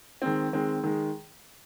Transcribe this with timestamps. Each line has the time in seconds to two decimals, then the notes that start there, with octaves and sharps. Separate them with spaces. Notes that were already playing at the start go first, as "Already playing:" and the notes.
0.22 D#3 G#3 C4
0.53 D#3 G#3 C4
0.84 D#3 G#3